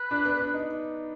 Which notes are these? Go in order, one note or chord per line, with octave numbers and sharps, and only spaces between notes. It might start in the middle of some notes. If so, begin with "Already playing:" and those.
Already playing: B4
D4
B3
D4
D#4